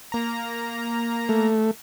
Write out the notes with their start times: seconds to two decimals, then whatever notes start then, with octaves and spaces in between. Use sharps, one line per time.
0.12 A#3 A#5
1.29 A3